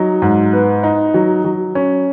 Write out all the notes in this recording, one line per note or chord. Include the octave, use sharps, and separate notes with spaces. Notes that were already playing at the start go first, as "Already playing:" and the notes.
Already playing: F#3 D#4
G#2
B3
D#4
F#3
F#3
C#4